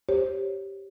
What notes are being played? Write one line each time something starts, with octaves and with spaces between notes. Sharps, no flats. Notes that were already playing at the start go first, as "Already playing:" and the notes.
G4 C5 C#5